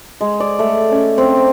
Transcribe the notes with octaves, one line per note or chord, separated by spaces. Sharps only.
G#3
D5
A3
C#4
C4